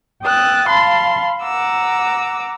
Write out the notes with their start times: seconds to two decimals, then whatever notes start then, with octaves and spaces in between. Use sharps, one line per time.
0.23 G5 D#6 E6 F#6 A6
0.68 F5 A5 B5 C6
1.43 F#5 A#5 D6 E6